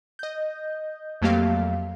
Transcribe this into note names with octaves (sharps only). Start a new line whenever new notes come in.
D#5 G6
F2 F#3 A3 A#3 G4 F5